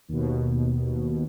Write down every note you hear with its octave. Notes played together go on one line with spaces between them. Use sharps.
D#2 B2